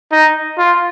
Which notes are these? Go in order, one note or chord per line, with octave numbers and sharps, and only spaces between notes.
D#4
F4